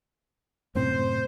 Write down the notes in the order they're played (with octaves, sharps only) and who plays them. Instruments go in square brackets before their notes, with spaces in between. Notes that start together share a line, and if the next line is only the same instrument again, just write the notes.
[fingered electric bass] F#2 A2 C3 [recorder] C5